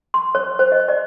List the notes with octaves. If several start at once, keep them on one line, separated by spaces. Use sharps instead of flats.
C6
C#5
C5
D#5
D5